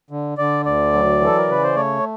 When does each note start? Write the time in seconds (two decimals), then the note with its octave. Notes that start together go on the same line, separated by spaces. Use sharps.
0.11 D3
0.38 D3 D5
0.65 D2 D5
0.93 F#3
1.20 E3 A4
1.38 A#4
1.48 C#3 B4
1.63 C5
1.75 A3 C#5